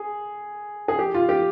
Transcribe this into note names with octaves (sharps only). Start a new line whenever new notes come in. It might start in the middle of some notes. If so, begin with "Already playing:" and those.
Already playing: G#4
G#4
G4
F4
G4